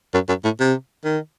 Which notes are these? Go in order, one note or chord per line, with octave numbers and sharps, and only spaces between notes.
F#2
F#2
A2
C3
D#3